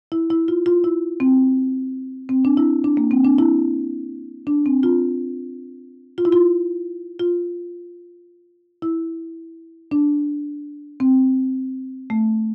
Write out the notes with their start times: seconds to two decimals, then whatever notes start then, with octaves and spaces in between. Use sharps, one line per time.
0.12 E4
0.30 E4
0.48 F4
0.66 F4
0.84 E4
1.20 C4
2.29 C4
2.45 D4
2.57 E4
2.84 D4
2.97 A#3
3.11 C4
3.25 D4
3.38 E4
4.47 D4
4.66 C4
4.83 F4
6.18 F4
6.25 E4
6.33 F4
7.19 F4
8.82 E4
9.91 D4
11.00 C4
12.10 A3